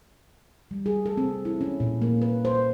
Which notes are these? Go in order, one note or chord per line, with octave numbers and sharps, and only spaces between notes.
G3
G#4
A4
C4
E4
C#4
A#2
A#3
B4
C5